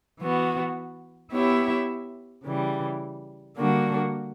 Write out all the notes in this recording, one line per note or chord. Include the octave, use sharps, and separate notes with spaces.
E3 B3 F#4
B3 E4 G4 C#5 E5
C#3 E3 G3
D3 G3 A#3 D4 F#4